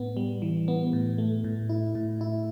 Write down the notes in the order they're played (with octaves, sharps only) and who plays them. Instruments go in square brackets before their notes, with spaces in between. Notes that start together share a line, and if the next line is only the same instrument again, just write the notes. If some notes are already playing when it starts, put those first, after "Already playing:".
Already playing: [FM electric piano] A2 B3
G3
E3
B3
A2
A3
A2
E4
A2
E4